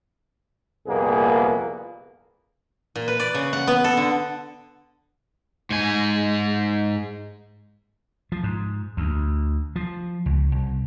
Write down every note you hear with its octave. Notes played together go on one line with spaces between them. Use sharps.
C2 F2 A#2 A#3 B3 G#4
A#2
B4
D5
C#3
F#5
B3
A4
D3
G#2 G#5
F3
G#2
D2
F3
C#2
C2